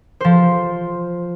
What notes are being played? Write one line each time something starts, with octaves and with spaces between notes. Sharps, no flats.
F3 C5